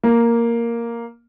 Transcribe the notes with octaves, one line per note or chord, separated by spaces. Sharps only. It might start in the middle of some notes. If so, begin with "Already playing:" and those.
A#3